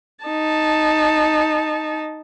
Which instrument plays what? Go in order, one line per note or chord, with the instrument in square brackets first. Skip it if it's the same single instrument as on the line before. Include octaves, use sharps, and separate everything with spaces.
[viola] D#4 A5